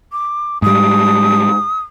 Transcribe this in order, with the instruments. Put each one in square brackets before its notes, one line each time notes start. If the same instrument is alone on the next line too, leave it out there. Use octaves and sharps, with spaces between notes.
[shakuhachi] D6
[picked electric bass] G#2 G3 [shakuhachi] D#6